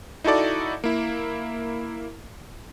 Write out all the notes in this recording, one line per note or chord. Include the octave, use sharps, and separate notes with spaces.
D#4 E4 F#4 A4 D5
A#3 E4